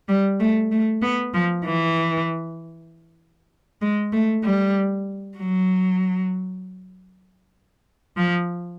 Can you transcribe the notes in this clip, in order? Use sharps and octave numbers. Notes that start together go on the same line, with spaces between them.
G3
A3
A3
B3
F3
E3
G#3
A3
G3
F#3
F3